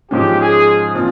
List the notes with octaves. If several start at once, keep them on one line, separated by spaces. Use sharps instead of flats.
G#2 F3 G#3 C#4 G4
G#4
A#2 F3 C4 F4